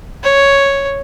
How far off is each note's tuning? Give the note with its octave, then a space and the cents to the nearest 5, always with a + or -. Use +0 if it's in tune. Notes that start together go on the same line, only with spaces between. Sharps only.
C#5 +0